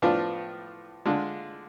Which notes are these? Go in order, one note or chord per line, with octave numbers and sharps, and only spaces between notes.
A2 F3 B3 D4 F4
D3 G#3 D4 F4